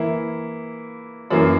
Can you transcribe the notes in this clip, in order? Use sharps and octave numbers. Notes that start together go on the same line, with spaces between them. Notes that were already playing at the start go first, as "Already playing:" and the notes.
Already playing: E3 A#3 E4
F#2 E3 A#3